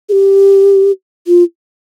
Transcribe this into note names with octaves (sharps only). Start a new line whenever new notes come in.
G#4
G4
F4